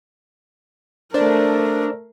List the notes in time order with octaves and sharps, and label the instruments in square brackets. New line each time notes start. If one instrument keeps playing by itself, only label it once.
[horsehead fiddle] A3 A#4 [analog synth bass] D4 [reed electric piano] C5 D5